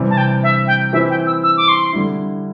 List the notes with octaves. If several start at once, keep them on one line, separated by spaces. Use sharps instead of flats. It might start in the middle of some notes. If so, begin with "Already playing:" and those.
Already playing: C3 E3 G3 C4
A5
G5
E5
G5
E3 C4 E4 E5
G5
E6
E6
D6
C6
D3 G3 E4